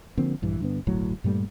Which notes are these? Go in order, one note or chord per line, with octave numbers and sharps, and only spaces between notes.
D3 F3 A#3 C4
A#1 G2 E3
G2 D3 B3
D1 G1 A2 F#3
G2 A#2 G3 A3